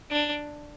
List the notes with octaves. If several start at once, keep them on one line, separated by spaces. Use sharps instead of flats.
D4